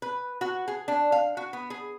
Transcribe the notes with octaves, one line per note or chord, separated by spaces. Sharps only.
B4
F#4
G#4
D4
F5
F#4
B3
G#4